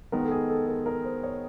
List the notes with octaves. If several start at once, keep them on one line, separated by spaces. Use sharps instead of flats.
D#3 G#3 B3 A#4
A4
G#4
A4
A#4
A#4
C5
C#5